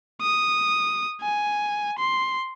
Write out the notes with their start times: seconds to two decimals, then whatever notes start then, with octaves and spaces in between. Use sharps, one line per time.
0.22 D#6
1.22 G#5
1.99 C6